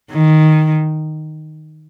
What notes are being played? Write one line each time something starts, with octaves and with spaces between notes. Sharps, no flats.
D#3